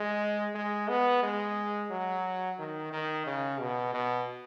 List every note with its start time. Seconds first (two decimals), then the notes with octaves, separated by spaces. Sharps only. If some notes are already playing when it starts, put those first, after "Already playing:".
Already playing: G#3
0.55 G#3
0.89 B3
1.23 G#3
1.91 F#3
2.59 D#3
2.93 D#3
3.27 C#3
3.60 B2
3.94 B2